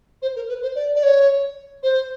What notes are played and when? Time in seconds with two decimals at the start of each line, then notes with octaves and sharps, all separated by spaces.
0.22 C5
0.36 A#4
0.49 B4
0.63 C5
0.76 D5
0.96 D5
1.03 C#5
1.83 C5